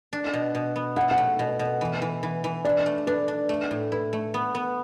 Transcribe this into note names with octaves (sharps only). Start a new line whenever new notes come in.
D4
B2
B2
B3
E4 F#5
F#5
A3
B2
B2
E3
E3
E3
E3
D4 D5
A3
D4 B4
D4
A3
A2
E4 B4
A3
B3
B3